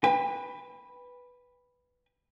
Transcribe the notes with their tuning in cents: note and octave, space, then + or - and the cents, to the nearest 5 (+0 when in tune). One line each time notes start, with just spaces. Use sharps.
B4 +0 G5 +35